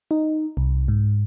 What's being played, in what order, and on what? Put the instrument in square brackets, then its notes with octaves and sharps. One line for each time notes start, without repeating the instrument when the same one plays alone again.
[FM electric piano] D#4
C2
G#2